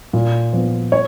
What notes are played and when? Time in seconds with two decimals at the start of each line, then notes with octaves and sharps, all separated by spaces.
0.13 A#2
0.53 F3 B3
0.92 C#5